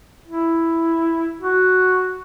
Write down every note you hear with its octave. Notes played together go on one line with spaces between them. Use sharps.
E4
F#4